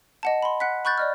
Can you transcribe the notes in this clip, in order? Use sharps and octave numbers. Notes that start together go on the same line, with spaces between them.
D#5 F#5 A5
B5 C6
F#5 F#6 B6
B5 C#6 F#6 G6 A6
D5 D#5 F6